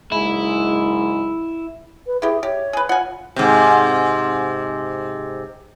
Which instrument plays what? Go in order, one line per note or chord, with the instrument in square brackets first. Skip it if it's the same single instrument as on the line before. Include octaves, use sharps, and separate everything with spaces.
[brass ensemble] F#1 G#2 G#3 [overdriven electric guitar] E4
[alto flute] B4
[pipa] E4 G4 [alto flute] G#4
[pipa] G4 [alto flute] C#5
[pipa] G#4 B4
[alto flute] F4 [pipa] F#5 G#5
[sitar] G#2 C3